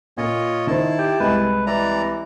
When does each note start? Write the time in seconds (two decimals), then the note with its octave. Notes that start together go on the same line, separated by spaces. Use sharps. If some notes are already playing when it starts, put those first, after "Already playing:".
0.18 A#2 F4 C#5 D#5
0.67 D#3 E4 C5 A5
0.99 G4
1.20 C2 G#3 B4
1.67 E3 D5 A#5